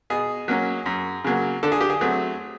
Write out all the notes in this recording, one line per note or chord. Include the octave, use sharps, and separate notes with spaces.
B2 G#4
F#3 A#3 C#4
F#2
C#3 F#3 A#3
D3 A4
G#4
G4
G#4
F#3 A3 C4